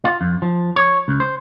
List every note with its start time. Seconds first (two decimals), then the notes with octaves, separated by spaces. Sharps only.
0.05 F4
0.21 F2
0.42 F3
0.76 C#5
1.08 C#2
1.20 C5